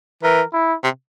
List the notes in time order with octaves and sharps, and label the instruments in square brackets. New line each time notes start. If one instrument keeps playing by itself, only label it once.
[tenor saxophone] E3 [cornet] A#4
[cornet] E4
[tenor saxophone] C3